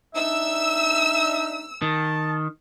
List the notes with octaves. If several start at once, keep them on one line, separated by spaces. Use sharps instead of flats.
D4 D#4 E5 E6
D#3 A5